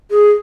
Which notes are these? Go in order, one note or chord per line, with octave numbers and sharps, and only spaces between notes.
G#4